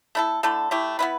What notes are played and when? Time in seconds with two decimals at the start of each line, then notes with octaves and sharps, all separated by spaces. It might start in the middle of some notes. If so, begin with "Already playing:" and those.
0.15 A3 E4 A4
0.43 D3 A3 E4 A4
0.71 A3 E4 G4
0.99 B3 E4 B4